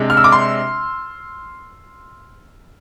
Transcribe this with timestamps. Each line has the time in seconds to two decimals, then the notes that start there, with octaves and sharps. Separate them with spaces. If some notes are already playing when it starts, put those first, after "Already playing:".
Already playing: C3 G#3 D4
0.10 F6
0.17 E6
0.24 D6
0.32 C6